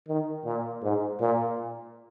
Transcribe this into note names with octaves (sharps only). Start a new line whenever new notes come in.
D#3
A#2
G#2
A#2